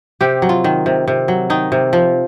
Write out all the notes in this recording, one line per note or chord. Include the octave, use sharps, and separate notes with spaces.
C3 G4
F#3
F4
D#3
C3
C3
F#3
D#3 D#4
C3
F3